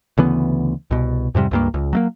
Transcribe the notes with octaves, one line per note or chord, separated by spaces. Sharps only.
D2 C#3 E3 B3
C2 B2
F2 G#2 C3 G3
C#2 G2 A#3
C#2
F#3 A3 A#3